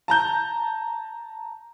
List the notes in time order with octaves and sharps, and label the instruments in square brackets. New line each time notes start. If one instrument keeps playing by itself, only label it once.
[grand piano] A5 A#5 G6